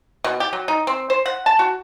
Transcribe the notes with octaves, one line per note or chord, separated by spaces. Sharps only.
B2
G4
F#3
D#4
C4
C5
F#5
A5
F#4